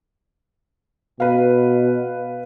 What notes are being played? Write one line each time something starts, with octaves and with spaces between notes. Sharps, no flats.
B2 B4 F5